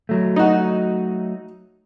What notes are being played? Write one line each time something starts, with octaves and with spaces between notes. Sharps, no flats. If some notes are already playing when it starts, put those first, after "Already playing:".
F#3 A3
D#4 F#4